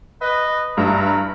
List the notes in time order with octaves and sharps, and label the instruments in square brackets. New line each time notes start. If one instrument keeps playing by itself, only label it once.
[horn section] B4 D#5
[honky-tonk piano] G2 [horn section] E4 B4 A#5